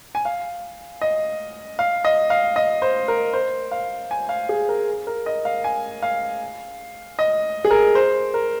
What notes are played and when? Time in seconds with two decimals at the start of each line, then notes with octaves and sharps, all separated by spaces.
0.15 G#5
0.25 F5
1.02 D#5
1.79 F5
2.05 D#5
2.30 F5
2.56 D#5
2.82 C5
3.08 A#4
3.33 C5
3.72 F5
4.11 G#5
4.29 F5
4.49 G#4
4.69 A#4
5.07 A#4
5.26 D#5
5.45 F5
5.64 G#5
6.03 F5
7.19 D#5
7.65 G#4
7.70 A#4
7.95 C5
8.34 A#4